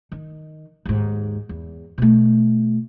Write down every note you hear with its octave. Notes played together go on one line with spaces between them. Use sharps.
D#3
D#2 G#2
E2
B2 A3